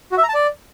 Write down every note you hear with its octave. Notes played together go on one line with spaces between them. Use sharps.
F#4
E5
A#5
A5
D5